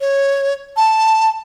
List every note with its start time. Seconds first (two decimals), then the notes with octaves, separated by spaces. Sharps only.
0.01 C#5
0.77 A5